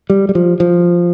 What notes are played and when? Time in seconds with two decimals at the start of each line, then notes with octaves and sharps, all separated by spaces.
0.10 G3
0.29 G3
0.35 F3
0.60 F3